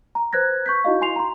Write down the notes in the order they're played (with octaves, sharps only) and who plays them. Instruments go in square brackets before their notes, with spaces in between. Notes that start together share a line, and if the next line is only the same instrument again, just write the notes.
[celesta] A#5
B4 C5 F#6 G#6 A#6
C#6 G6 B6
D#4 E4 F#4 D#5 F5
E4 G#5 C6 C7 F7
A#5 C6